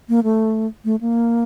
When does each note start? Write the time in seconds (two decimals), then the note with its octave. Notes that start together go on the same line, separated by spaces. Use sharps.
0.09 A#3
0.24 A3
0.85 A3
1.01 A#3